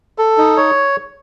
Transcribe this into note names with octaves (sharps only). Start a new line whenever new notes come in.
A4
D#4
C#5